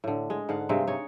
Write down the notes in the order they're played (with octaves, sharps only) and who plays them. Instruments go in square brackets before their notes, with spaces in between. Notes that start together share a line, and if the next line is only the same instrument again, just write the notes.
[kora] A2 D3
G#3
G#2 D3 F5 F#5
G2 C3 G#3 C4
G#3 D#4 C#5